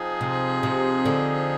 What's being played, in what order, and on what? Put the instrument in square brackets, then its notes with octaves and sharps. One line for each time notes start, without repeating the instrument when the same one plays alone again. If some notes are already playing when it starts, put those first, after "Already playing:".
Already playing: [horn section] F3 C4 D#4 G#4
[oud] C3
C3
D3